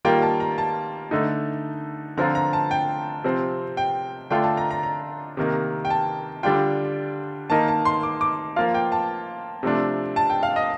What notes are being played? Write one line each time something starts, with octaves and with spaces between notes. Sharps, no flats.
D#3 G3 A#3 F4 G5
A5
A#5
A5
D3 A3 D#4
D3 F3 C4 F4 A#5
A#5
A5
G5
C3 F3 C4
G5
D3 A3 D4 F4 G5
A5
A#5
A#5
A#5
C3 D#3 A#3
G5
A5
D3 G3 D4 F4 G5
D#3 A#3 D#4 A5
A5
C6
D6
D6
F3 A#3 F4 F5
G5
A5
C3 F3 A3 D4
A5
G5
F5
D#5